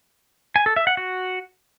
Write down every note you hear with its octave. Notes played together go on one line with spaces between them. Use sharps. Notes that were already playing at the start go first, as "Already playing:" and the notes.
G#5
A4
E5
F#5
F#4